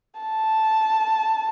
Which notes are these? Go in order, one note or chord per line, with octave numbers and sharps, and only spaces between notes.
A5